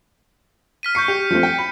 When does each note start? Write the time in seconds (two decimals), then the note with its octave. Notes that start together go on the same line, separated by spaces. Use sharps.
0.83 F6 B6 D#7
0.95 C#6 G6 C7 C#7
1.08 G4
1.31 F3 A3 C4
1.43 G5
1.58 B5